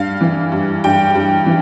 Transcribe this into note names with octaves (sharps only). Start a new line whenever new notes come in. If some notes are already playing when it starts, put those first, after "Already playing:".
Already playing: G2 F5
E3
G2
G2 G5
G2
E3